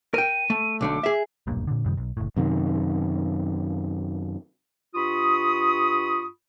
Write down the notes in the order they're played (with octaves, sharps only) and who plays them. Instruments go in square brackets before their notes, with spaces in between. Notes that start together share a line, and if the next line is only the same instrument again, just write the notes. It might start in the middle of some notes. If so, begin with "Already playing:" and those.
[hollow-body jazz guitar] A#4 G5 [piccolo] D#7
[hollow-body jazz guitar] A3
[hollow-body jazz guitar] B1 D3 A3 [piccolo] D6
[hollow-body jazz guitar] G#4 E5
[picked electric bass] D#1 B1 G2 A#3
A#2 D3
F#2 C3 D#3 G3
B1
F#1 A2
[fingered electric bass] F#2 C3 D#3
[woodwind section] G2 F4 B5 C#6 D#6